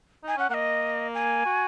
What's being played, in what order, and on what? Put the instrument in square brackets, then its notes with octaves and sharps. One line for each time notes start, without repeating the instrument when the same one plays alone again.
[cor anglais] D#4 [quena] G#5
[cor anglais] C#4 [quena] F#5
[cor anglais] A#3 [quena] F#5
[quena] D#5
G#5
[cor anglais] F#4